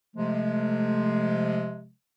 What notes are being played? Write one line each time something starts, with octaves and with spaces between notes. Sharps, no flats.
C3 F3 G#3 A3